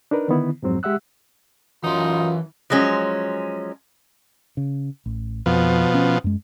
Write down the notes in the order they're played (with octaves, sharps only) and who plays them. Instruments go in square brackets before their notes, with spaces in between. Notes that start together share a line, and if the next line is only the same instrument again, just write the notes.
[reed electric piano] D4 D#4 A#4 B4
D3 D#3 B3 E4
F2 G#2 F#3 C4
G#3 G4 E5 F#5 E6 F#6
[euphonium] F#2 [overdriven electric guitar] E3 C6 [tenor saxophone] D#4 [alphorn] F4
[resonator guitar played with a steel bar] F3 F#3 G#3 C#4
[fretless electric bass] C#3
A1
[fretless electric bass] F2 [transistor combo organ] B2 F3
[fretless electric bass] C#4
F#2 G#3